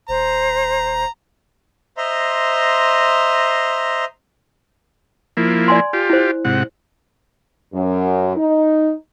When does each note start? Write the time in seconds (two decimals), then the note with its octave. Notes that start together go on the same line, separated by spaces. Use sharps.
0.09 D#1 C5 A#5
1.97 C5 D#5 E5 A#5 C6
5.37 F3 A#3 E4
5.68 D5 G#5 C6
5.93 F4 G4
6.10 E4 C5
6.45 G#2 C3 F#5
7.74 F#2
8.37 D#4